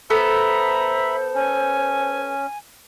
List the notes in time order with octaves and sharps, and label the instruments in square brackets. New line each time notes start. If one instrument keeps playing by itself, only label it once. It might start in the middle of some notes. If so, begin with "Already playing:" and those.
[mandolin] B3 A4 [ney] C5 [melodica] E5 B5 [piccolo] A#5
[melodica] C#4 [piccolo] G#5